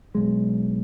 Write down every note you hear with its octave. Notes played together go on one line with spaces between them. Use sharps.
B1 G#3